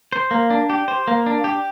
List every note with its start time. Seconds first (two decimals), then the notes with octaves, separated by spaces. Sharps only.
0.13 C5
0.31 A#3
0.50 D4
0.70 G4
0.88 C5
1.08 A#3
1.26 D4
1.44 G4